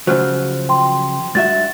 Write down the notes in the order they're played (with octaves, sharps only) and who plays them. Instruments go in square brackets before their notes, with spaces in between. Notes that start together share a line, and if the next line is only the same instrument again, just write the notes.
[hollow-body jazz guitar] C#3 F3 F#3 [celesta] C5 F6
[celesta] G5 C6
[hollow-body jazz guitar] G2 F#4 E5 [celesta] A6